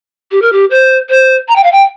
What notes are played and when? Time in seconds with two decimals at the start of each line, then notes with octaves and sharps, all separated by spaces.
0.31 G4
0.42 A#4
0.52 G4
0.71 C5
1.09 C5
1.48 A#5
1.56 G5
1.64 F5
1.72 G5